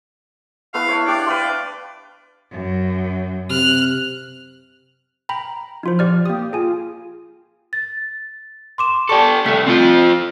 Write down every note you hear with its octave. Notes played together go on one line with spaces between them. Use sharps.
A3 B3 E4 F5
A3 C#5
D4 G4 D5
B4 F5 C6
F#2
C3 F6 F#6
G5 A#5 B5
F3 D#4 F4 C5
G4 D5 F6
A#3 G4 D#6
F4 G#4 G#5
A6
C6 D6 E7
G4 A4 D5 A5 C#6
C2 A3 A4 B6
C4 F4